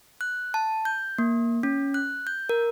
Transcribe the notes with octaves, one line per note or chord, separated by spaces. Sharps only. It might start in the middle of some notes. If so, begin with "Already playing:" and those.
F#6
A5
G6
A#3
C#4
F#6
G6
A#4